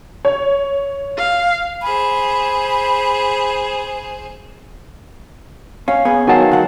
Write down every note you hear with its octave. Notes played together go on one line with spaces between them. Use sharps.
C#5
F5
G#4 C5 B5
C#4 F5
B3 C#4 G#4
D#3 F#3 F5 F#5 G#5 A5
D2 F#5